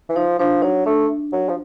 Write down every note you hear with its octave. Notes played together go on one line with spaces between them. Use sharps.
E3
F3 D#4
F3 D4
F#3 D#4
A3 D4
F#3
F3